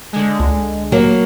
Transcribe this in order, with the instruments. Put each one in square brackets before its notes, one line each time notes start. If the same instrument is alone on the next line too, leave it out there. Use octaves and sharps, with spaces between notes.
[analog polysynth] D3 G#3
[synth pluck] C#2
[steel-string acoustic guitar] F#3 A#3